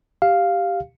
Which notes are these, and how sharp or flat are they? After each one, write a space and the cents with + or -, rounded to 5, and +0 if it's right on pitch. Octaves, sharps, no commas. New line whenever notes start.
G4 +0 F5 +0